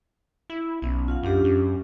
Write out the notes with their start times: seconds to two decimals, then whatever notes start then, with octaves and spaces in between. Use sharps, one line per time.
0.50 E4
0.82 B1 B3 C#4
1.08 F4 F5 F#5
1.23 F#2 C#4 D4 G4
1.44 F#2